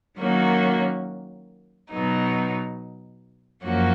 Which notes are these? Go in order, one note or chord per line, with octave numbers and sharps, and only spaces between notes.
D#3 F#3 A#3 C#4 F#4
B2 F#3 B3 D#4
F#2 F3 A#3 C#4 F#4